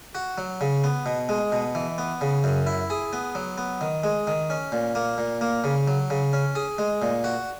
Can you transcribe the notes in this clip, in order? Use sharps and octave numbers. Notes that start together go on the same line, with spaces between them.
F#4
F#3
C#3
B3
B2
G#3
B2
E3
B3
C#3
F#2
E4
G#4
B3
F#3
B3
D#3
G#3
D#3
C#4
A#2
A#3
A#2
A#3
C#3
F#3
C#3
C#4
G#4
G#3
A#2
F#4